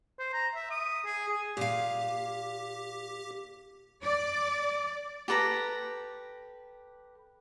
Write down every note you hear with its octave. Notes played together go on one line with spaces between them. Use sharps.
C5
A#5
E5
D#6
G#4
G#4
A#2 G4 F5
D5
G4 A4 B4 A#5